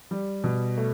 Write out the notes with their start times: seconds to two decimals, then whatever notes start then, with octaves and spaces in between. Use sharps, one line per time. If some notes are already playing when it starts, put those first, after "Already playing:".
0.11 G3
0.44 B2
0.78 A3